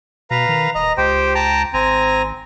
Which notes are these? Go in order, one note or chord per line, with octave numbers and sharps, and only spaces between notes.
B2 B4 F5 A#5
D#3
D#1 D#5 A#5
C#2 G4 C5 G5
G5 A5 A#5
G#1 C4 G#5 A#5